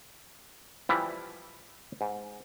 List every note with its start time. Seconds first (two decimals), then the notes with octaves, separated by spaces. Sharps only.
0.89 E3 F3 G3 E4
2.01 G#2